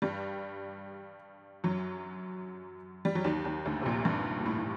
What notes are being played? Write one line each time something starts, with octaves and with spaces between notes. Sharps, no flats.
G2 G3
F#2 F#3
G3
F#3
D#2 D#3
D#2 D#3
D2 D3
C3
A#1 A#2
G2
A#2
A2
A2